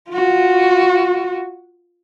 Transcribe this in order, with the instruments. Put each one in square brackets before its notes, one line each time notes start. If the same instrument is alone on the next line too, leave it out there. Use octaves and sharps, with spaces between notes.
[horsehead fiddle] F4 F#4